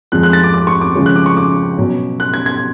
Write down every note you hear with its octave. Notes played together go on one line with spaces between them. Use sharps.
F2 F3 G#3 F#6
F#6
A6
D6
D6
C#6
D6
C#3 F3 G#3 C#4
F#6
D6
C#6
D6
B2 F#3 C#4
F#6
G#6
G#6